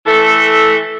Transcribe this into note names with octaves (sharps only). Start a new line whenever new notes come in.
E3 A3 A4